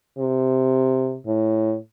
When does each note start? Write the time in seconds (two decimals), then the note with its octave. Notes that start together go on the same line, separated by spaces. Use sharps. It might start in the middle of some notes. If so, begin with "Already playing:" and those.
0.19 C3
1.26 A2